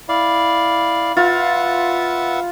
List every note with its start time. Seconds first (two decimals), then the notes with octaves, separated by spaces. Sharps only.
0.09 E4 D5 F5
1.17 F4 B4 E5 F#5